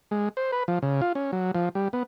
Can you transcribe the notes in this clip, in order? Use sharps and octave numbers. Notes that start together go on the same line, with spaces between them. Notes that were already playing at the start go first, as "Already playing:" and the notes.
G#3
C5
B4
F3
C#3
F4
C#4
F#3
F3
G3
B3